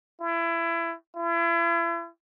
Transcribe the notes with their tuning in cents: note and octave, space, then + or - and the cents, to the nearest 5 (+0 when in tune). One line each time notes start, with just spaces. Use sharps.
E4 +25
E4 +40